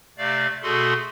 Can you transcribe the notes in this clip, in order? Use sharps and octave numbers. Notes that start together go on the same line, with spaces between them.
C3 A3 D5 F5
B2 A3 F#4 G#4 A4 C6